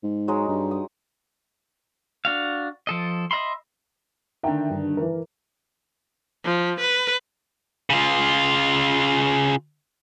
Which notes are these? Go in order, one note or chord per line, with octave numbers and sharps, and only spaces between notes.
G#2
F#3 G#3 D#4
G2
D#6
D4 F#4 F5
F3 A4 D#5
D#5 E5 B5 C6
D3 D#3 E5 G5 A#5
G2
E3 A#4
F3
B4
C#3 F4